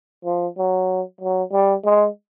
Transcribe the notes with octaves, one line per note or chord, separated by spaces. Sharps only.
F3
F#3
F#3
G3
G#3